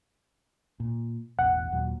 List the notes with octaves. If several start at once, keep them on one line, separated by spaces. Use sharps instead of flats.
A#2
E1 A1 F#5
D#2 A#2 F#3